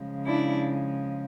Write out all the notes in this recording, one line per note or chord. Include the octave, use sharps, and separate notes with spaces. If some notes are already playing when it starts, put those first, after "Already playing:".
Already playing: C#3 F3 G#3
D4 E4